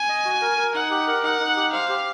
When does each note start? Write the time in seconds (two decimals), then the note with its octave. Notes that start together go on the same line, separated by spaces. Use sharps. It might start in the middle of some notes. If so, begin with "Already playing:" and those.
Already playing: G#5
0.09 D#5
0.25 F#4
0.42 A#4
0.58 A#4
0.75 D#4 F#5
0.90 G4
1.07 A#4
1.23 D#4 F#5
1.40 D#4
1.57 G4
1.73 C5 F5
1.89 G4